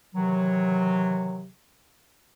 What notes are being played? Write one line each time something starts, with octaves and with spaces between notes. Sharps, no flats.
C3 D#3 E3 F#3